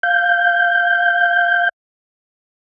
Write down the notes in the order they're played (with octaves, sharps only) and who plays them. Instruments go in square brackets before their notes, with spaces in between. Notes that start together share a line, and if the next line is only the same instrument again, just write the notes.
[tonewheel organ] F5 G6